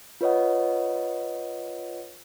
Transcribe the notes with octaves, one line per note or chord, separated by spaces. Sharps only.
F4 B4 C#5 D#5 F#5